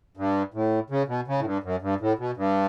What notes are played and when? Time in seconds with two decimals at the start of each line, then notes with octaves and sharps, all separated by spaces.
0.17 G2
0.54 A2
0.90 C#3
1.08 B2
1.27 C#3
1.39 A2
1.45 G2
1.63 F#2
1.82 G2
2.00 A2
2.18 B2
2.37 G2